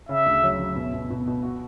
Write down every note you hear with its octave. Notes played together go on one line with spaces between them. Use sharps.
C#3 E5
D2
F#3
F#3
B2
B2
B2
B2
F#4